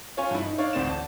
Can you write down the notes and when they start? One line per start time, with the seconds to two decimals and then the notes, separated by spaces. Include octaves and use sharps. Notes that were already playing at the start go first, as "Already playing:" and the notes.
0.17 C#4 F4 C#5 G#5
0.31 G2 E4
0.43 D#4
0.58 D4 D#4 C#5 D5 F5
0.73 A1 D2 C4 C5 D5 E7
0.90 A5